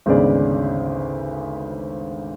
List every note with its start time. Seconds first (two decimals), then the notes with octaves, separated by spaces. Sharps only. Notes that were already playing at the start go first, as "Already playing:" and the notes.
0.06 G#1 D2 C#3 B3 G#4 D5